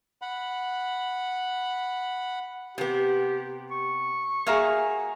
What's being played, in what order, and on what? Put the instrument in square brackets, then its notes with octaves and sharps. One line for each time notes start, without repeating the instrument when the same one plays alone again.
[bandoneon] F#5 B5
[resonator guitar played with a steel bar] C3 B3 [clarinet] G4
[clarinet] C#6
[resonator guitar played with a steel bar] A#3 F#4 E5 [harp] G#4 A#5 F6